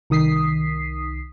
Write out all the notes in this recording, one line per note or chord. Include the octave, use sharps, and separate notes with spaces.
C2 D#3 D#6 B6 C7